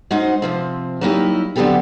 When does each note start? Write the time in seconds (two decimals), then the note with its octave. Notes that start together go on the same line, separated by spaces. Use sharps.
0.11 G#3 C#4 D#4 F#4 C5 F#5
0.42 C3 F3 C4
1.01 F#3 G3 A#3 D#4 E4 G4
1.56 D3 F#3 B3 C4 G4 A4